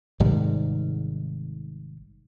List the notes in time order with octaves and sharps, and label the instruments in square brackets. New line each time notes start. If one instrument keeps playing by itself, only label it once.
[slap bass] G#1 G#2 C3 G3